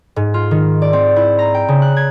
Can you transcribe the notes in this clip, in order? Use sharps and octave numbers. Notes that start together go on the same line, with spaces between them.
G#2
F4
D#3
D5
C4
E4
A#5
G5
C#3
F#6
G#6